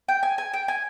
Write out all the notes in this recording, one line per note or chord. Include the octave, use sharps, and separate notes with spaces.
G5
G#5
G#5
G5
G#5